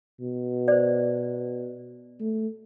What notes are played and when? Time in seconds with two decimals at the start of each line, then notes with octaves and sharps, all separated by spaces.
0.20 B2
0.68 C5 D5
2.21 A3